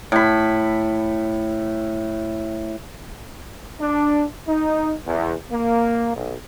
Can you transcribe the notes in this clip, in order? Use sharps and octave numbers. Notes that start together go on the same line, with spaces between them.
A2 B5
D4
D#4
E2
A#3
B1